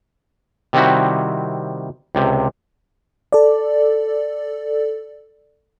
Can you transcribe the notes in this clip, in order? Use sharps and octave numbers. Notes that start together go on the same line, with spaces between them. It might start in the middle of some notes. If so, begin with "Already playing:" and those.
C3 D#3 G3 C4 E4 F#4
C#2 C3
A4 D5